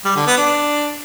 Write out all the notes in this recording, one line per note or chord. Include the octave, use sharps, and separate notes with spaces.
G3
D3
B3
D4